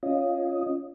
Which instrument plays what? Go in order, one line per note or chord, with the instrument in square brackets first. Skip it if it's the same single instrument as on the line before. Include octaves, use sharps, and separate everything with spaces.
[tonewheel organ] C#4 F4 D#5